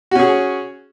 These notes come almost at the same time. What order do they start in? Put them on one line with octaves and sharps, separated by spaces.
F#4 C#4 G#4